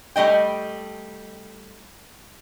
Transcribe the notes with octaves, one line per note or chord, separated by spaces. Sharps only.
G3 A3 D#5 G5